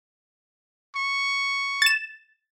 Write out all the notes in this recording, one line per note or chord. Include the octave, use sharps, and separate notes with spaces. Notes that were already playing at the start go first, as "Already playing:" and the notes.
C#6
A6 E7